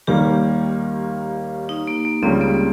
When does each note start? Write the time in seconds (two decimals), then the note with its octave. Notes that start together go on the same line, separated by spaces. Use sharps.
0.07 D#2 D#3 G3 A#3 G4
1.69 D#4
1.87 A#3
2.05 A#3
2.23 C#2 C#3 G3 C4
2.41 A#3